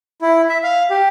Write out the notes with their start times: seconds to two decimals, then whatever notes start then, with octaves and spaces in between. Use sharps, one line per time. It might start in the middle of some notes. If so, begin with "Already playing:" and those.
0.22 E4
0.49 E5
0.63 F5
0.90 G4